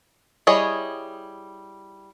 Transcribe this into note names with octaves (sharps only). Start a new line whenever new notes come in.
G3 E4 G#4 C#5 D#5